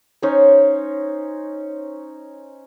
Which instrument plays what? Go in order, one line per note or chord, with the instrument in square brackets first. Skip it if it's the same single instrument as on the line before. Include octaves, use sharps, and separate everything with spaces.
[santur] C#4 D#4 C5 C#5